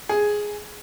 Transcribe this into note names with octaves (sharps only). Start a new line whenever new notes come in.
G#4